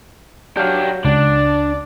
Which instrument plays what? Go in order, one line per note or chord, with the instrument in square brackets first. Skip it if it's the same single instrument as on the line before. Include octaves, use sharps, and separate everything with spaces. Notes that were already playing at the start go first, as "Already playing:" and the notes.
[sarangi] F#3 [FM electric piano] D4 [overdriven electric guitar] G4 F5
[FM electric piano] C#2 [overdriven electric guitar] D4 [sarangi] D5